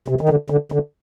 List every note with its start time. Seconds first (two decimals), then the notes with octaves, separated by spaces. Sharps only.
0.08 C3
0.21 D#3
0.29 D3
0.50 D3
0.72 D3